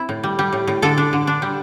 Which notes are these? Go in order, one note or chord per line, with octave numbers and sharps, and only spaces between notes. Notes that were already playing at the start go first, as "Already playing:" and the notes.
Already playing: C4 E4
A2
G3
G3
A2
A2
D3 A4
D4
D3
D4
G3